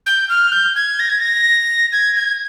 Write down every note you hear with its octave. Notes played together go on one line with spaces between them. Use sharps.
G6
F6
G6
G#6
A#6
G#6
A#6
G#6
G#6